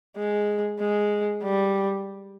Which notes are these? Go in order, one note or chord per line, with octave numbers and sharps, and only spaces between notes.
G#3
G#3
G3